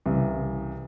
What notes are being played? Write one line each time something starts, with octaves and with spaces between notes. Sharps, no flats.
C2 C#3 E3